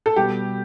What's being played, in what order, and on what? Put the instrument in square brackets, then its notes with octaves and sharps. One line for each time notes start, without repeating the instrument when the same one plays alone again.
[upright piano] A4
[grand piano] B2 G3 B3 [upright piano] G4